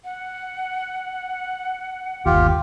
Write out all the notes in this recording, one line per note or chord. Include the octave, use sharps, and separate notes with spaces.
F#5
G1 D#2 F4 G4